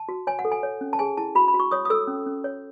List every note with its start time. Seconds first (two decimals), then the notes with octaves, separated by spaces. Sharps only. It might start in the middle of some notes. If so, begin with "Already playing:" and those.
Already playing: A5
0.09 F#4
0.27 C#5 G#5
0.39 F#5
0.45 A4
0.52 G#5
0.63 C#5
0.81 C#4
0.93 A5
0.99 G#4 G#5
1.17 E4 A5
1.35 F#4 B5
1.48 B5
1.54 F#4
1.60 C#6
1.71 C#5 D#6
1.85 D#6
1.90 A4 E6
2.07 C#4
2.26 C#4
2.44 C#5